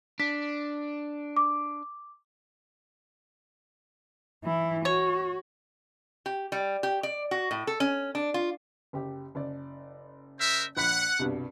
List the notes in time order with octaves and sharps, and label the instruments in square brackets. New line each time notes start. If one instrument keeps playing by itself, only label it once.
[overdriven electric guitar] D4 [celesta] B6
[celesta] D6
[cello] E3 E4
[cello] F#4 [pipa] C#5
[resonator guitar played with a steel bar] G4
G3
G4
D5
F#4
A2
A4
C#4
D4
F4
[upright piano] F#1 G4
F#1 D5
[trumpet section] A#4 C5 E5
[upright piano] A#1 B5 B6 [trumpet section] F#5
[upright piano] C2 G2 B2